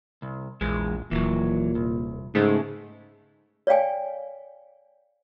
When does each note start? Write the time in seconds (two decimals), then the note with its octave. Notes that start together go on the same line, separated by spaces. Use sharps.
0.22 C2
0.61 A#1 E2 G#3
1.11 D#1 A#2 E3 F#3
1.75 C2
2.35 G#2 C#3 G#3 A3
3.67 C#5 D5 F5 G5 G#5